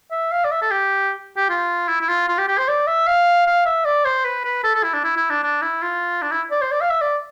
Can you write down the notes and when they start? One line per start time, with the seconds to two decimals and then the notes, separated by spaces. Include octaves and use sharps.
0.11 E5
0.32 F5
0.44 D5
0.51 E5
0.62 A4
0.71 G4
1.37 G4
1.50 F4
1.88 E4
2.01 E4
2.08 F4
2.28 F4
2.38 G4
2.48 G4
2.58 C5
2.68 D5
2.87 E5
3.07 F5
3.47 F5
3.65 E5
3.85 D5
4.05 C5
4.24 B4
4.44 B4
4.64 A4
4.75 A4
4.84 E4
4.94 D4
5.04 E4
5.17 E4
5.30 D4
5.43 D4
5.62 E4
5.82 F4
6.22 D4
6.31 E4
6.51 D5
6.61 C5
6.71 D5
6.81 F5
6.90 E5
7.01 D5